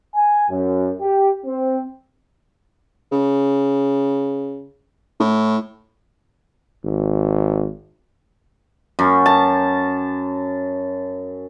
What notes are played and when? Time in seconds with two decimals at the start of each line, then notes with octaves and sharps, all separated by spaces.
0.15 G#5
0.50 F#2
1.00 G4
1.46 C4
3.12 C#3
5.20 A2
6.83 G#1
8.99 F#2
9.26 A5